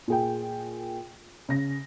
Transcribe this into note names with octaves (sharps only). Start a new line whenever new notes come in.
A#2 G#4 G5
C#3 A#6